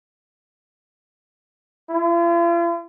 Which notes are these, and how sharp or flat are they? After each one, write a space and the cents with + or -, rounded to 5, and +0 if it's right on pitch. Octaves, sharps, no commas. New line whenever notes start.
F4 -45